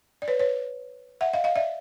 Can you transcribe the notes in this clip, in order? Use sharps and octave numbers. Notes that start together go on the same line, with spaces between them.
D5
B4 C#5
B4 C#5
E5 F#5
D#5 F5
D#5 F5
D5 E5